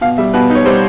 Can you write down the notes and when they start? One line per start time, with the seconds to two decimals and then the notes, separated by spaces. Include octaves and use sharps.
0.01 B2 F5
0.18 G3 E5
0.34 B2 B4
0.50 D#4
0.55 C#5
0.66 G3 C5